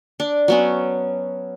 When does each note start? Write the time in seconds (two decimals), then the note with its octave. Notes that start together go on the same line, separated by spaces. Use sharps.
0.20 D4
0.48 F#3 B3 C#4